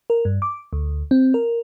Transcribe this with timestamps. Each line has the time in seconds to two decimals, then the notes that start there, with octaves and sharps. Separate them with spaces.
0.10 A#4
0.25 G2
0.42 D6
0.73 D2
1.11 C4
1.34 A#4